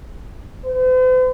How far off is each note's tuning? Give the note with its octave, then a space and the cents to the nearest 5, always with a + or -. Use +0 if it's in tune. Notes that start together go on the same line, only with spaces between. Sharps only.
C5 -45